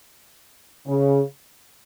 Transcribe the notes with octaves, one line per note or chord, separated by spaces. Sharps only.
C#3